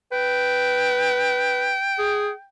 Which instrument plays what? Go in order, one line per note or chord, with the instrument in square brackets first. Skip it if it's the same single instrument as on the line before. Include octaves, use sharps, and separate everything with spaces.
[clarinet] B4 [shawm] G5
[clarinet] G#4